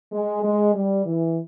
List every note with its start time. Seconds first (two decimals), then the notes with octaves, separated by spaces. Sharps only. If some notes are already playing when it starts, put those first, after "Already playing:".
0.12 G#3
0.43 G#3
0.74 G3
1.06 E3